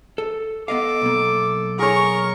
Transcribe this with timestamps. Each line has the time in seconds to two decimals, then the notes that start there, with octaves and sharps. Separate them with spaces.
0.18 A4
0.68 B3 A4 D#5 F5 D6
1.02 B1 A#3
1.79 G#4 A#4 C#5 C#6